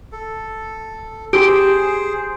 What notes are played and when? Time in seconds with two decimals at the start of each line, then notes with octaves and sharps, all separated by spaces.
0.12 A4
1.33 G4 G#4 C5 D7